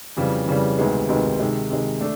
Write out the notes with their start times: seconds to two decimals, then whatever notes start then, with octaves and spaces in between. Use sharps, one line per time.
0.17 F2 C#3 E3 G3
0.48 F2 C#3 E3 G3
0.78 D2 C3 D#3 G#3 B3
1.09 D2 C3 D#3 G#3 B3
1.40 C3 D#3 G#3
1.70 C3 D#3 G#3
2.01 A3 D4